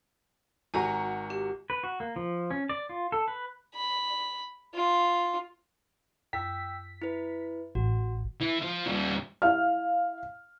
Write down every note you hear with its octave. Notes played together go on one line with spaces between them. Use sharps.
G#1 F#4 G#5 A#5
G4
B4
F#4
A#3
F3
C#4
D5
F4
A4
B4
B5
F4
F#2 G5 E6 B6
E4 B4
A1 F#4
E3
F3
D#2 G3
E4 F5 F6